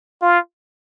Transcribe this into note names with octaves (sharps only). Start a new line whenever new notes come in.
F4